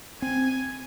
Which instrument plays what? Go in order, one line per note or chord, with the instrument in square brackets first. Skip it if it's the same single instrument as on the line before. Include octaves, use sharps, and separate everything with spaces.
[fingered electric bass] C4 [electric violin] G#5